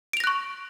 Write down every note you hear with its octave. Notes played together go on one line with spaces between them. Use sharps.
C#6 F#6 A#6 D7 F7